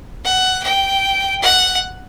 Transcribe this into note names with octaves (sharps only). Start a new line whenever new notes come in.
F#5
G5
F#5